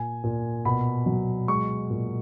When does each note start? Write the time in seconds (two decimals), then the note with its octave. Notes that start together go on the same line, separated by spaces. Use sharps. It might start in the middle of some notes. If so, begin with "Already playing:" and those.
Already playing: A#2 G#5
0.24 A#2
0.65 B2 B5
1.06 F#3
1.48 G#3 C#6
1.90 A#2